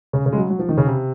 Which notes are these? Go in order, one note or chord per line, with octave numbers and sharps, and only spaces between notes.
C#3
C#3
G#3
F#3
F#3
F3
D#3
C#3
C3